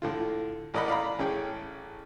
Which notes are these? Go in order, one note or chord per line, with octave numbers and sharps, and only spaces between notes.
A2 D3 F4
A1 A#4 D5 D#5 F#5 B5
D5 F5 A#5 B5
A1 C#4 G#4 G5